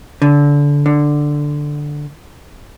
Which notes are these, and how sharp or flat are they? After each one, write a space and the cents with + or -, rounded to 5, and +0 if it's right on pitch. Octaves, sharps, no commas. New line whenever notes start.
D3 -20
D3 +5